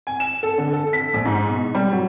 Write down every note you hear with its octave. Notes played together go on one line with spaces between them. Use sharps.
G#5
E7
A4
D3
A4
B6
A#1
G#2
B2
G3
F#3